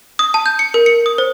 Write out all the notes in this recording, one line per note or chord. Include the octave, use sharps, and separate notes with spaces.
D#6
A5
G6
C#7
A#4
C#7
D#6
C5